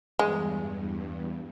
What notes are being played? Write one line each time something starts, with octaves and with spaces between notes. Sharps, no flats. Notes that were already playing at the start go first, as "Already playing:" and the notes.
E2 G2 G#3